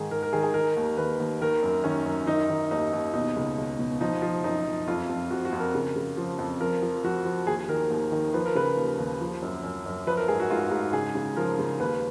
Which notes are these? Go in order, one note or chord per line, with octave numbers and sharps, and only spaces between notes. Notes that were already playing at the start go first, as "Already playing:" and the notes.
Already playing: G#2 D#3 G#4
D#3 A#4
A#4
D#3 G#4
G#4
D#3 A#4
D#2
D#2 B4
D#2
D#3 A#4
F#2
D#3 C#4
F#2
D#3 D#4
D#3
D#2 D#4
D#2
B2 D#4
C#2
C#2
B2
F3 D#4
F3
F#2 D#4
F#2
F2 F4
F2
F3 F#4
F#4
F2
A#4
C#3
C#3
F3
F2
F3 A#4
F3
F3 F#4
F3
D#2 G#4
D#3 A#4
D#2
D#3
F3 B4
A#4
C#3 B4
D#2
D#2
F3
F#2
F#2
F#2
F3 B4
A#4
G#2 G#4
F#4
G#2 F4
G#2
C#3 G#4
C#3
F3 A#4
C#3
D#2 B4